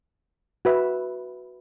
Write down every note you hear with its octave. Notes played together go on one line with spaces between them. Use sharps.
F#4 B4 E5